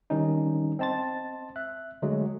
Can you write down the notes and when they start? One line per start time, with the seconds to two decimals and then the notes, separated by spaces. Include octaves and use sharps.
0.10 D#3 G3 C#4 D#4
0.79 C4 D#5 A5 C6 A6
1.56 E5 F#6
2.02 D3 F#3 G#3 A3